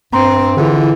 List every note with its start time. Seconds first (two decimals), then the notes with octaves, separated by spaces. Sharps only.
0.13 G2 C4 A#5 C6
0.57 D3 E3 E4 F4 G#4